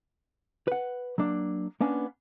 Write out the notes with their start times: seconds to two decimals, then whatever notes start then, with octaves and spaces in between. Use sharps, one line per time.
0.68 B4 F#5
1.18 F#3 A#3 D4
1.81 A#3 B3 C#4 D4